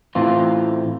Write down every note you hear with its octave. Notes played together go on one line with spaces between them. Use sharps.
A2 E3 C4 F4